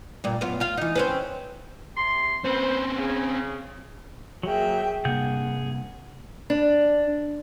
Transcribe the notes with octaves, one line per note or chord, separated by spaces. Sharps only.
G2 A#2
F#2 B3 F4
F4 F5
E3 D#4
C4 C#4 B4
C3 C6
C4 C#4 B4 C5
C#3
F#3 A#3 G#4 E5 G5
G2 C3 A#3 G#4 F#5 G6
D4